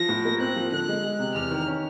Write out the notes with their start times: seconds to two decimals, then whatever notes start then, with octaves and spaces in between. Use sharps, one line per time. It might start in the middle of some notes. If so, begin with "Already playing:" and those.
Already playing: F3 A#6
0.09 A2
0.25 A#3
0.40 C4 F#6
0.56 F3
0.72 D3 F#6
0.88 G#3
1.04 G#3
1.19 C3
1.35 E2 F6
1.51 D#3
1.67 C#4